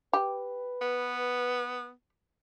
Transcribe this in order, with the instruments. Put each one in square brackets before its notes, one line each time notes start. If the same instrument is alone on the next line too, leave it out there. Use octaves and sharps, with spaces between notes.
[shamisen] G4 [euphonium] B4
[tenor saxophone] B3